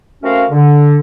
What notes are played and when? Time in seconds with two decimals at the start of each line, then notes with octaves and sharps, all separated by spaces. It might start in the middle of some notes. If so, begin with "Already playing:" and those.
0.23 A3 C4 C#4 F#4 A#4 F5
0.50 D3